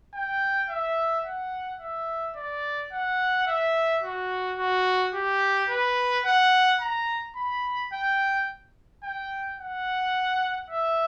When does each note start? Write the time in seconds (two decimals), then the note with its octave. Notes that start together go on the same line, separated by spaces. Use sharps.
0.14 G5
0.69 E5
1.25 F#5
1.80 E5
2.36 D5
2.92 F#5
3.47 E5
4.03 F#4
4.58 F#4
5.14 G4
5.70 B4
6.25 F#5
6.81 A#5
7.37 B5
7.93 G5
9.04 G5
9.60 F#5
10.71 E5